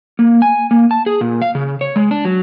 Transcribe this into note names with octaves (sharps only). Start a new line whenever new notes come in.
A#3
G#5
A#3
A5
G#4
A#2
F5
C#3
C#5
G#3
D4
F#3